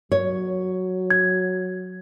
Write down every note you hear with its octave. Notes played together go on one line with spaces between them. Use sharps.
F#3 C#5
G#6